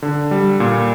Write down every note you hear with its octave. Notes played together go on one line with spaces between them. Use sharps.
D3
G3
A#2